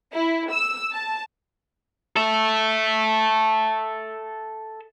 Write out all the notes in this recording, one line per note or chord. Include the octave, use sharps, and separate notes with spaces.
E4
E6
A5
A4 E5